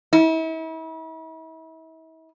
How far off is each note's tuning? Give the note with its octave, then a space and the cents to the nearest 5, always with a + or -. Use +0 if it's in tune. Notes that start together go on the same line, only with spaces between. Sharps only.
E4 -40